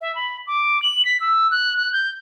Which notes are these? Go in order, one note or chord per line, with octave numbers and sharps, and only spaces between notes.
E5
B5
D6
F#7
B6
E6
F#6
F#6
G6